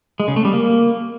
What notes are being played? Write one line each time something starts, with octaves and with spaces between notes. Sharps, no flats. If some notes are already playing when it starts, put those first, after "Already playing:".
G#3
C#3
A3
G3
A#3